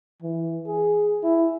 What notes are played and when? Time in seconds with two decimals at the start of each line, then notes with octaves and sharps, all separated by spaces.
0.23 E3
0.67 G#4
1.24 E4